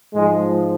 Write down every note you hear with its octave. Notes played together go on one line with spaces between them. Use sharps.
G#2 F3 G#3